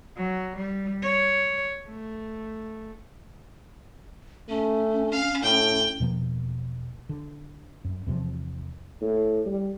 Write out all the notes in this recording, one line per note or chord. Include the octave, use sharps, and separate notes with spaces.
F#3
G3
C#5
A3
A3 C#4
F5
A2 G5
E2 B2 F3 A#3
D3
F#2
E2 C3 F3
A2
G3